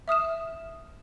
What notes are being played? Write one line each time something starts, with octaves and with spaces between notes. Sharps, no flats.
E5 D#6 F6 E7